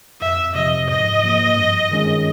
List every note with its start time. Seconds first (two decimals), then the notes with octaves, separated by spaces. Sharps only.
0.21 F2 E5
0.54 C3 F3 D#5
0.88 G#2 D#5
1.23 F3 A#3
1.57 G2
1.91 D#3 G#3 C#4 F4